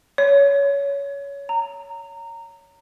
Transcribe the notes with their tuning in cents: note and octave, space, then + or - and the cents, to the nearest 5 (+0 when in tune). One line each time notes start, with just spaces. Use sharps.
C#5 +15
A#5 -20